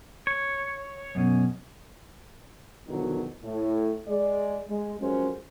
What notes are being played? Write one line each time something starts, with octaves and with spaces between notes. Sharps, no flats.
C#5
F#2 B2 C#4
E2 B2 D3 D#3 F3 F#3
A2
G#3 D5
G#3
F2 F#3 G#3 C#4 A#4 C5